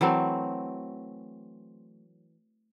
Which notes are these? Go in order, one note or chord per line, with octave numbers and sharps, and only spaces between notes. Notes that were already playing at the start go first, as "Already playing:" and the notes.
E3 F#3 A3 C4